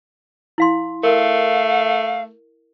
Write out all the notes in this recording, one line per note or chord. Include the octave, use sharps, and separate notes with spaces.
E4 F5 C6
A3 A#4 F5